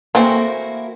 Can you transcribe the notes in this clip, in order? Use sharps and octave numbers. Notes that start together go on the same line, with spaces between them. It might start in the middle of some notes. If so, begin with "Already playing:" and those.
E3 A3 A#3 C4 E4 F#4